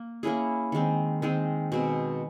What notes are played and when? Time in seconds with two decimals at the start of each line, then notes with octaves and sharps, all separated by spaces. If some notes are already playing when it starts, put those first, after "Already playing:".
Already playing: A#3
0.23 A#3 C#4 E4 G#4
0.72 D#3 G#3 C4
1.22 D#3 G#3 C4
1.72 B2 G#3 C4